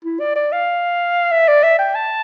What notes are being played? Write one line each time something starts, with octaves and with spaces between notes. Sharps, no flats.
E4
D5
D5
F5
E5
D5
E5
G5
A5